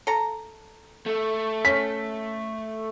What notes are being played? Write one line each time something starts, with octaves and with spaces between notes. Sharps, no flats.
A4 A#5
A3
C#4 B6